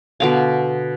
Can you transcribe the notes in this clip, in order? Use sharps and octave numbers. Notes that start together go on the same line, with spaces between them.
B2 D3 F5